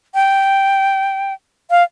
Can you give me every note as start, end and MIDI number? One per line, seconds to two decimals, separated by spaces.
0.15 1.33 79
1.70 1.83 77